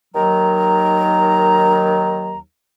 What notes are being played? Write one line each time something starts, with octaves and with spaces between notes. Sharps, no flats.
D#2 D#3 F#3 A#5